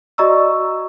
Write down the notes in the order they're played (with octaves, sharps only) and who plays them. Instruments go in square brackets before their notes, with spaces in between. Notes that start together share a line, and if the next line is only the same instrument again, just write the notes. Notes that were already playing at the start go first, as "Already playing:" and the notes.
[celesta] F#4 D5 D#5 A#5 C#6 E6